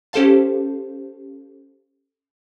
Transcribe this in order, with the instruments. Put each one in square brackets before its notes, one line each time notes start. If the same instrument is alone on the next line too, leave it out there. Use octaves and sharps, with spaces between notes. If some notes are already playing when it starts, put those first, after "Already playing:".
[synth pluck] C#4 G4 A4 C5 F5 A5